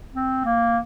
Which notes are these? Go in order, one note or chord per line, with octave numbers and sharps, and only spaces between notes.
C4
A#3